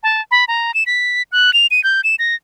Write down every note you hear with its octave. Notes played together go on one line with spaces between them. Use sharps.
A5
B5
A#5
E7
B6
F#6
F7
D#7
G6
E7
A#6